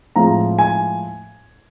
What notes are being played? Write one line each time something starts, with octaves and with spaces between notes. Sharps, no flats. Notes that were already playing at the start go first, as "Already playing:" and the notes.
A2 F3 G#3 C4 A#5
G#5